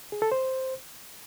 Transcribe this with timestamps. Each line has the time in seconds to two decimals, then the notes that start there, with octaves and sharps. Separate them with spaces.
0.12 G#4
0.22 A4
0.32 C5